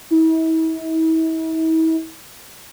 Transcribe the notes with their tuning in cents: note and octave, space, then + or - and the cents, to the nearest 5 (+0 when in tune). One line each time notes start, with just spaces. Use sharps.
E4 -40